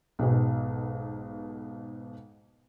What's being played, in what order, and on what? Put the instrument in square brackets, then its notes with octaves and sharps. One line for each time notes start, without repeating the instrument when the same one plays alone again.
[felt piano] B1 G#2 B2